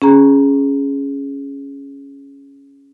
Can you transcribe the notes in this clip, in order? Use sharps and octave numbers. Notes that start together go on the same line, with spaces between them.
C#4 G#4 A#5